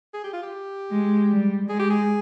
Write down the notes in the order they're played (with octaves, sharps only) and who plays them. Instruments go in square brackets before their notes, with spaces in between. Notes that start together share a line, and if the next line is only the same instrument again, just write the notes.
[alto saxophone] G#4
G4
F4
G4
[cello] G#3
G3
[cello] G#3 [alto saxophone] G#4
[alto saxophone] G4
G#4